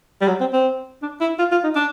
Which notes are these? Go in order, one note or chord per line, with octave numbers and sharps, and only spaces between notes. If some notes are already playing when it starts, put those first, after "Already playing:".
G3
F#3
C4
C4
D4
E4
F4
F4
D#4
D4